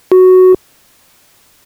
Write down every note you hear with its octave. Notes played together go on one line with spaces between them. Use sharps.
F#4